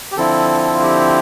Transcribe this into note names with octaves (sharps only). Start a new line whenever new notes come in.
G4
D3 F3 C4 E4 A4
F4
G4